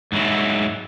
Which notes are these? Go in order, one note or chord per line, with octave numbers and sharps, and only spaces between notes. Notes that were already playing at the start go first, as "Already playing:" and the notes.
G#2 F#3 E4